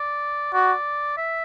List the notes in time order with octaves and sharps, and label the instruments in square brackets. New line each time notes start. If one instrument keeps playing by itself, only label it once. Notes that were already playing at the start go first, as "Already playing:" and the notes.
Already playing: [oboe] D5
[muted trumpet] F#4 [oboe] D5
[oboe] E5